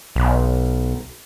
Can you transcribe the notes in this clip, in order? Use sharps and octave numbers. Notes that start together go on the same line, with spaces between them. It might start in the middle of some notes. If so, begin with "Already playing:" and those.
B1